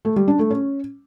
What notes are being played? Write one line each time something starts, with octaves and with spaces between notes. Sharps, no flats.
A3
G3
D4
A3
C#4